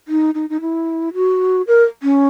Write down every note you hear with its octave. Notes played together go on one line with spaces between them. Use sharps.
D#4
D#4
D#4
E4
F#4
A#4
C#4